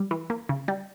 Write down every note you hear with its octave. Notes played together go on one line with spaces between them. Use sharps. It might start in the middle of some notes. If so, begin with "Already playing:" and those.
Already playing: G3
E3
A#3
C#3
G3